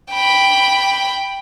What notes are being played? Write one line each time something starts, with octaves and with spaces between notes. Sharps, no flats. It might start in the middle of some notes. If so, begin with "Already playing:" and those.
G5 B5